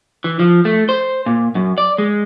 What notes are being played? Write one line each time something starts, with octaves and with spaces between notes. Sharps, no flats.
E3
F3
A3
C5
A#2
F#2
D5
G#3